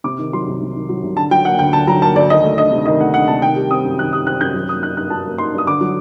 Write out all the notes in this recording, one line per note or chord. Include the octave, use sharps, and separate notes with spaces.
C3 D6
D#3
F#3 C6
C2
C3
D#3
F#3
C2
D3 A5
F#3 G5
A#3 F#5
D2 G5
D3 A5
F#3 A#5
A#3 A5
D2 D5
D#3 D#5
A3
D4 D#5
C3
D#3 D#5
A3 F#5
D4 F#5
C3 A5
D#3 G5
G3
C4 D#6
F#2
D#3 F#6
G3 D#6
C4 F#6
F#2 G6
F#3
A#3 D#6
D#4 F#6
G2 F#6
F#3 A5
A#3
D#4 C6
G2
D#6
D3 D6
F#3